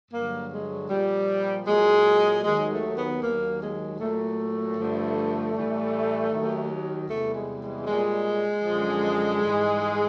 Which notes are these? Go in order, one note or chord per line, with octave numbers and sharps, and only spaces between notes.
G2 D3 F#3 A#3
G#3
A#2 F3 G3
A#2 F#3 G#3
D#2 D#3 F#3 G#3
A3
B3
D#2 D#3 F#3 A#3
G#3
A#2 F#3 A3
G2 D3 F3
A2 E3 G3
D#2 D#3 F#3
E2 C3 E3 G3 A3
G#3
G#3
A#2 G3 G#3
F#2 D3 F3
G#2 E3 G3